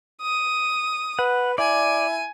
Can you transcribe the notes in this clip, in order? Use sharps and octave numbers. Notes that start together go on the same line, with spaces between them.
D#6
B4 F#5
E4 D5 G#5